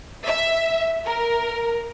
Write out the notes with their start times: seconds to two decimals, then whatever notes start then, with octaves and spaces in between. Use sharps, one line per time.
0.24 E5
1.06 A#4